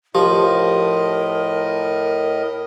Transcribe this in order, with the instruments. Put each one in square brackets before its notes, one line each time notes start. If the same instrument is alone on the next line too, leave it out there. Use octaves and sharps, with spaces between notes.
[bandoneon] A2 D#5 [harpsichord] F3 [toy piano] G4 [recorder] A#4